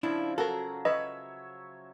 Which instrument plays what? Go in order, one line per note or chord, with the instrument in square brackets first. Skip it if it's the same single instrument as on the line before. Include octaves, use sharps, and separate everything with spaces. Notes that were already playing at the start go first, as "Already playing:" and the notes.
[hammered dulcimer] C#3 F3 [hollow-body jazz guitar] D4 E4
[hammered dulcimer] F#3 [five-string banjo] F#4 A#4 [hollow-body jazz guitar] A4
[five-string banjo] B4 [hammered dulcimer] C#5 E5 [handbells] D#5